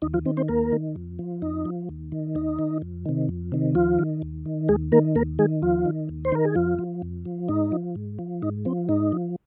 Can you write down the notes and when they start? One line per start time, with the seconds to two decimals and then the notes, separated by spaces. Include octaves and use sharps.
0.02 D#2 D#4
0.14 F3 F4
0.25 D#3 C4
0.37 C4 C5
0.48 D#2 A#3 A#4
0.72 D#3
0.96 F2
1.19 F3
1.42 F2 D#4
1.65 F3
1.89 D#2
2.12 D#3
2.35 D#2 D#4
2.59 D#3
2.82 F2
3.06 C3 D#3
3.29 F2
3.52 C3 D#3
3.75 D#2 F3 F4
3.99 D#3
4.22 D#2
4.46 D#3
4.69 D#2 G#3 G#4
4.92 D#3 A#3 A#4
5.15 D#2 A#3 A#4
5.39 D#3 G#3 G#4
5.62 D#2 F3 F4
5.86 D#3
6.09 D#2
6.25 C5
6.32 D#3 A#4
6.45 G#4
6.55 F2 F3 F4
6.79 F3
7.02 F2
7.25 F3
7.49 G#2 D#4
7.72 F3
7.95 G#2
8.19 F3
8.42 G#2 D#4
8.65 F3 C4
8.89 G#2 D#4
9.12 F3